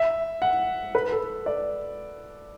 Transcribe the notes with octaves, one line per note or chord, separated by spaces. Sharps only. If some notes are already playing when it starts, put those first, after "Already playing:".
Already playing: E5
F#5
B4
A4
D5